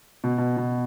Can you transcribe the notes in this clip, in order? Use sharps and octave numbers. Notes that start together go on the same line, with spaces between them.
B2
B2
B2